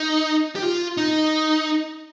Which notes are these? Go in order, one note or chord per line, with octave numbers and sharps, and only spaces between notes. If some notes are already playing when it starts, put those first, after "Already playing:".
Already playing: D#4
G4
F4
D#4